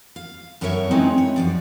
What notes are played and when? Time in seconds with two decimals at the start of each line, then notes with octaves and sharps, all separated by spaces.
0.16 F5
0.61 F#2 B3 A4 A#4 C#5 E5
0.91 G#3 C4 C#4 D#4 E4 B4
1.18 C#5
1.36 F#2 F3 D5